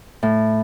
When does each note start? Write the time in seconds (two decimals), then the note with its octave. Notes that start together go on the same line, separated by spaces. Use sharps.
0.23 A2